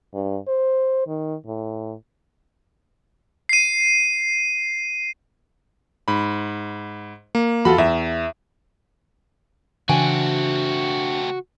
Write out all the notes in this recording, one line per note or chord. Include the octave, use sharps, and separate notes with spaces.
G2
C5
D#3
A2
C7 D#7
G#2 B5
A#3
E2 F4 F#4 A4 B5
E2 E5
C#3 E3 A3 C4 D4 F#4 G5 G#5